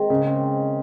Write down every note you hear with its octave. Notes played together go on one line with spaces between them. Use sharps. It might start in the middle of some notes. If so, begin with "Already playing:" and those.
Already playing: D#3 G#3 C4
G#2 C#3
C4
D#3